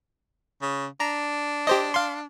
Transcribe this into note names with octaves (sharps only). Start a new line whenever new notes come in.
C#3
D4 A#5
G4 C5 D#5
F5 C6